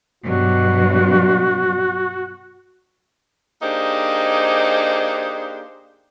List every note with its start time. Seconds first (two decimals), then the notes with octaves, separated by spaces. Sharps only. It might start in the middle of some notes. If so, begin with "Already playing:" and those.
0.24 G2 B2 F#3 F#4
3.62 A#3 D4 D#4 G4 G#4 C5